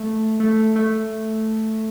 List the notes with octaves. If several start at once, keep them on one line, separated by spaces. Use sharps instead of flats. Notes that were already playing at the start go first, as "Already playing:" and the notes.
Already playing: A3
A3
A3